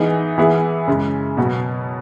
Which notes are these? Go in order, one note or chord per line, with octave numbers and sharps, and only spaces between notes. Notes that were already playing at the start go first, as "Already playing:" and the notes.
Already playing: E3 B3 D#4 G#4
E3 B3 E4 G#4
F#2 C#3 G#3
B2 F#3 B3 F#4